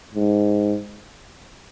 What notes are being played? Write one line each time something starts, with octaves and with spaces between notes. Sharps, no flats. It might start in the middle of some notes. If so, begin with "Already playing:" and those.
G#2